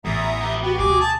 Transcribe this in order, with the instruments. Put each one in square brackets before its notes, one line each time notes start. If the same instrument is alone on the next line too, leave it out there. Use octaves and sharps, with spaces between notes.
[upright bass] A1 [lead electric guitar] E2 [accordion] E5 A#5 D#6
[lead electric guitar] B3 G4
[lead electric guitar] B3 [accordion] F#4 G4 G5
[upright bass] D2 B2 [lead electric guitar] G#4 [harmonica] D6
[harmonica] A5